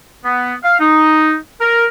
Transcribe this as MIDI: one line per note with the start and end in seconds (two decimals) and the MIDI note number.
0.24 0.53 59
0.63 0.77 77
0.79 1.35 63
1.60 1.85 70